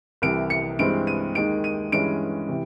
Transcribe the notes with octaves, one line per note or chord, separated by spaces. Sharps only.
C2 C3 E3 D7
C#7
G2 E3 G#3 C4 D7
D#7
D#2 D#3 G#3 D7
D#7
G2 E3 G#3 C#4 D7
C3 E3